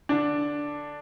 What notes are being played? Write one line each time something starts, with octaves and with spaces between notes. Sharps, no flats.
D3 D4